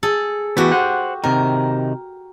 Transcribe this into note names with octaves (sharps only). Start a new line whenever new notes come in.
G#4 A4
E3 A3 B3 F#4 G4
C5 F#5
C3 D#3 A#4